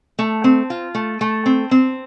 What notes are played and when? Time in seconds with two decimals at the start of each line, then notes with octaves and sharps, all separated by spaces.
0.19 A3
0.44 C4
0.70 F4
0.95 A3
1.21 A3
1.46 C4
1.71 C4